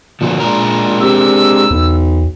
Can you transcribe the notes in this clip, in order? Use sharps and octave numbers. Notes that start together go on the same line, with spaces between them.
A#2 D3 F3 F#4
G#3 D4 A#4
C3 E6
B1 E2